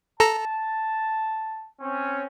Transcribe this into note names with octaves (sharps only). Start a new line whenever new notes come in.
A4 A5 A#5
C4 C#4